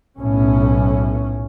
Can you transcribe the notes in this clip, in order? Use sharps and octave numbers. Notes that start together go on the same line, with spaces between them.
B1 A2 C#4